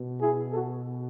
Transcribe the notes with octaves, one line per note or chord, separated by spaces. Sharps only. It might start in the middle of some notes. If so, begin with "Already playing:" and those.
Already playing: B2
E4 G#4
F#4 A4